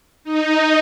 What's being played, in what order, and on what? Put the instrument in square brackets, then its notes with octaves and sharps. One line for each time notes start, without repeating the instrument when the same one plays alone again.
[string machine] D#4